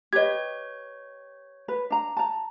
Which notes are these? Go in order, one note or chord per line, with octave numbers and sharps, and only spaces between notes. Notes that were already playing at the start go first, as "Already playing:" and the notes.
G4 B4 C#5 D#5 G#6
B4
D4 A#5
A5 A#5